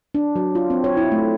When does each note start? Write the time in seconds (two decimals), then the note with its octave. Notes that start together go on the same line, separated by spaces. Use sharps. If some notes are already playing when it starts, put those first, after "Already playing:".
0.15 D4
0.36 F#3
0.55 F4
0.70 C4
0.84 C#5
0.97 E4
1.12 A3